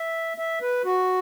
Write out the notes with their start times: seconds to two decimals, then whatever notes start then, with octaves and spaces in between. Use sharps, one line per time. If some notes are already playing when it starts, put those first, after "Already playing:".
Already playing: E5
0.38 E5
0.61 B4
0.85 F#4